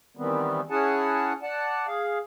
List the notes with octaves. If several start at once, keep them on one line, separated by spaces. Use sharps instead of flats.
D#3 E3 G3 B3 C4
C#4 E4 G#4 F#5 G#5 A5
D5 F#5 A5
G#4 F5